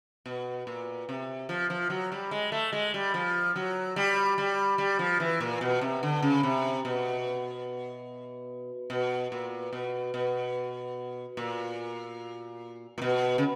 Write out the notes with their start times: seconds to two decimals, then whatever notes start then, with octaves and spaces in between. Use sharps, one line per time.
0.26 B2
0.67 A#2
1.09 C3
1.49 F3
1.70 F3
1.90 F#3
2.12 G3
2.31 G#3
2.52 A3
2.73 G#3
2.94 G3
3.14 F3
3.56 F#3
3.96 G3
4.38 G3
4.78 G3
4.99 F3
5.20 E3
5.40 A#2
5.61 B2
5.81 C3
6.03 D3
6.22 C#3
6.43 C3
6.85 B2
8.90 B2
9.32 A#2
9.73 B2
10.14 B2
11.37 A#2
12.98 A#2
13.02 B2
13.38 C#3